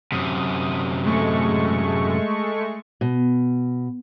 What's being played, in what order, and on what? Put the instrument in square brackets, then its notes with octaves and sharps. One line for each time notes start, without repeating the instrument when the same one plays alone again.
[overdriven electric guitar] F#2 C3 [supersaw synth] D#6
[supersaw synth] G#3 A3 C#6
[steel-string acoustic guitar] B2